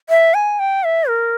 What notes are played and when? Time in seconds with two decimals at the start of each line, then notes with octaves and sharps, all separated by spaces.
0.10 E5
0.34 G#5
0.59 G5
0.84 E5
1.09 A#4